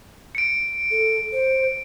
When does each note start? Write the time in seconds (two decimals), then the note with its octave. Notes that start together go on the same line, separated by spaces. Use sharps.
0.35 C#7 D7
0.91 A4
1.32 C5